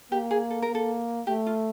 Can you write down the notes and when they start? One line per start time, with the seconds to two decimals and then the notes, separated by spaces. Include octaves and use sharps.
0.12 A#3 G4
0.31 G#4
0.50 A4
0.62 A#4
0.69 A#3
0.75 A4
1.27 A3 G4
1.46 F4